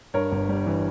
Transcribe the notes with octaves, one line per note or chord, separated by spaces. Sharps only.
G2 A#4 C#5
G1
G3
E3